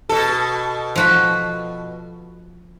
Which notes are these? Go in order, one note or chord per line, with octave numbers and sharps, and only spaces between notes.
B2 A4
F3 F#4 B5